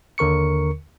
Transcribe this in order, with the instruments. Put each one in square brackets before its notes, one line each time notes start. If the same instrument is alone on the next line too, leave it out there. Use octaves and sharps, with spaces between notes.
[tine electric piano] D#2 D3 A#4 C#6 C#7